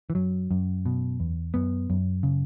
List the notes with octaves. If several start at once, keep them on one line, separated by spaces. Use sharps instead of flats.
E3
F#2 F#3
F#2
B2
E2
F#2 B3
F#2
C#3